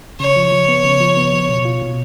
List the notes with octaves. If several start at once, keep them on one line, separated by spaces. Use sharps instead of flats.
C#3 C#5
F3
F3
B3
C#3
F3
B3
F3
B2
F4
B2